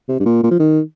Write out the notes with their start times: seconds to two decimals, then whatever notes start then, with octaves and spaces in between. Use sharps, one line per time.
0.09 C3
0.20 G2
0.26 A#2
0.43 A#2
0.51 F3
0.60 D#3